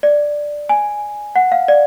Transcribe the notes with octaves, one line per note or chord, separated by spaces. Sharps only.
D5
G#5
F#5
F5
D5